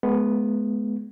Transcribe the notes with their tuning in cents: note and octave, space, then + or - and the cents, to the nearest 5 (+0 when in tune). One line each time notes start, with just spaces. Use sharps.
G#3 +35 B3 +0